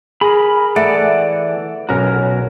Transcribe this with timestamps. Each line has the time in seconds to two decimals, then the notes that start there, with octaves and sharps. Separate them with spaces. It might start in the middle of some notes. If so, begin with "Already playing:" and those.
0.21 G#4 A#4 B5
0.76 E3 A3 D5 F#5
1.89 B1 C#4 F#4 A#4 A#5